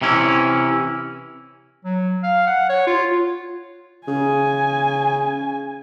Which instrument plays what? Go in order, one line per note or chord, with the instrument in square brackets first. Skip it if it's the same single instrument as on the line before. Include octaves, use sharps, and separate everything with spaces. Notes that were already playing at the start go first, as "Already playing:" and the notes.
[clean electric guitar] C3 E3 C#4 E4
[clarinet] F#3
F5
F#5
C#5
F4
[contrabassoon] C#3 [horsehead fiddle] G#5